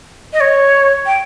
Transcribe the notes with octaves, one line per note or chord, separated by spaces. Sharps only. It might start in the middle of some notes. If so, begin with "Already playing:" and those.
D#5
C#5
G5